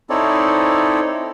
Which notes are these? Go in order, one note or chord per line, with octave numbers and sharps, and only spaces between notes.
C4 D#4 E4 A4 C#5 D5